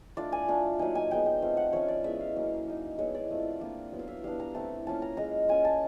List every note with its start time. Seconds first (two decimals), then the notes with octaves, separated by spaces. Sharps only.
0.17 A3 D4 F4 D5
0.32 G#5
0.48 A3 D4 F4
0.79 F#3 A#3 D#4 G#5
0.95 G#5
1.11 G#3 B3 D#4 G5
1.26 G5
1.42 A3 C4 F4
1.57 F#5
1.73 F3 A3 C#4 C#5
1.88 D5
2.04 G#3 B3 E4 E5
2.20 F5
2.36 F#3 A#3 C#4
2.67 A#3 D#4
2.98 G#3 B3 E4 C#5
3.15 D5
3.30 A3 C4 F4
3.61 A#3 D4 F4
3.92 F#3 B3 E4
3.99 F5
4.07 E5
4.24 G3 B3 D4 F5
4.40 A#5
4.55 A3 C4 E4 A5
4.87 A#3 C#4 F4 A5
5.02 A#5
5.17 G#3 C#4 F4 A#5
5.48 A#3 C#4 F4 G#5
5.65 A5